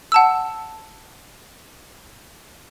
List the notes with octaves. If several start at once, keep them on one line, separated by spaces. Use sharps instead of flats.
F#5 A5 E6